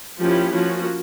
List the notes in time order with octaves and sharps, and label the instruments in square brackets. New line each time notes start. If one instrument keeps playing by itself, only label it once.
[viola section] F3 A#3 C#4 E4 G4
F3 A#3 C#4 F#4